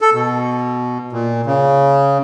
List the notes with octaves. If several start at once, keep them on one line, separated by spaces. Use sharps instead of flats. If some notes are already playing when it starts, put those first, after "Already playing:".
A4
B2
A#2
C#3